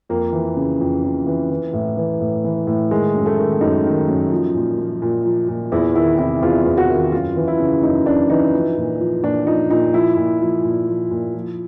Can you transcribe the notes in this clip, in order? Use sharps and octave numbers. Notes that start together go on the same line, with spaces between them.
F2 A#3
E3
C#3
F2
F2
E3
E3
A2
E3
A2
E3
A2
D#3 G#3
F#2
A3
D#3
F#2 D#4
D#3
F#2
F3
A#2
F3
A#2
F3
A#2
E2 E4
D#3 E4
C3 E4
E2 F4
E2
F#4
D#3
F#2 F4
E3
E4
C#3
F#2 D#4
F#2 D4
E3 D#4
F3
A#2
F3
A#2 D4
F3 D#4
A#2 D#4
F3 E4
A#2
F3
A#2
F3
A#2
F3